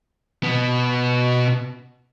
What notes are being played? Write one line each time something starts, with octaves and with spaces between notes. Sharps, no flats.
B2 B3